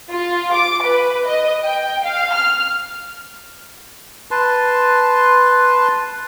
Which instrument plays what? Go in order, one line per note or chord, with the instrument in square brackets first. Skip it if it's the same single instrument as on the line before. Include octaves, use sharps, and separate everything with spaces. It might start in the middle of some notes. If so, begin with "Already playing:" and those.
[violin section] F4
D6
B4
D#5
G5
F5
F6
[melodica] B4 A5 C6